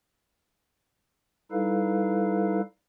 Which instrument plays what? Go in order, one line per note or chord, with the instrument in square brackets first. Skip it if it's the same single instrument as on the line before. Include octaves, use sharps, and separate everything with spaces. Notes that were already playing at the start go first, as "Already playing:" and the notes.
[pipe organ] G3 D#4 E4 A4 B4 F5